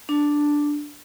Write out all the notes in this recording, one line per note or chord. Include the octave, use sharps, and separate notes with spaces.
D4